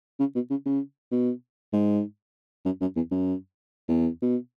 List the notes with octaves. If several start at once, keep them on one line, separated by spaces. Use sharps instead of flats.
C#3
B2
C#3
C#3
B2
G#2
F#2
F#2
E2
F#2
E2
B2